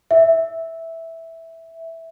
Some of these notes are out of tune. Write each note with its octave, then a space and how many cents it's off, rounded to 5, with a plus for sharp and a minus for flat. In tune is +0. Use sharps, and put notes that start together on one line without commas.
E5 -5